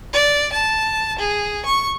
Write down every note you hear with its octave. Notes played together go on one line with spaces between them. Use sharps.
D5
A5
G#4
C#6